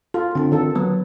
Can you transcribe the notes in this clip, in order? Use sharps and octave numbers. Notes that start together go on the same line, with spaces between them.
F4 A4
D3 C4 F4
D#3 A4
F#3 B3